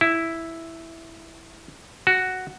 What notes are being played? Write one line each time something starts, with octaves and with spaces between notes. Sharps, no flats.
E4
F#4